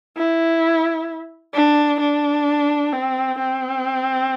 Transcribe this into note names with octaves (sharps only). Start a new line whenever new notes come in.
E4
D4
D4
C4
C4